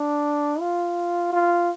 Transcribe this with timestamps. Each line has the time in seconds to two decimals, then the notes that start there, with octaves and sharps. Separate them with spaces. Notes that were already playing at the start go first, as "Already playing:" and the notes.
Already playing: D4
0.60 F4
1.33 F4